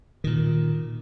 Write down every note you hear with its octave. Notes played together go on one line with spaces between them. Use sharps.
A#2 D#3